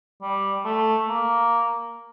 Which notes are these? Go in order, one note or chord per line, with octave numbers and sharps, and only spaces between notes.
G3
A3
A#3